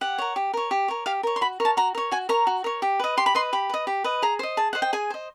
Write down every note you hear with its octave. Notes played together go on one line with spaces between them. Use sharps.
G4 F#5
A#4 C#5
G4
A#4 C#5
G4
A#4 C#5
G4 F5
A#4 C#5
C6
F#4 B5
A#4 C#5
A5
F#4 A#5
A#4 C#5
F#4 G#5
A#4 C#5 A#5
F#4
A#4 C#5
G4
B4 D#5
G4 C6
B5
B4 D#5 C6
G4 B5
B4 D#5
G4
B4 D#5
G#4 A#5
C5 D#5
G#4 A5
C5 D#5 F#5
G5
G#4 G#5
C5 D#5